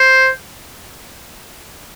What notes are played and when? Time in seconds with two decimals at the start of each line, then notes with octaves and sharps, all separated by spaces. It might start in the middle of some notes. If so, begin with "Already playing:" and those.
Already playing: C5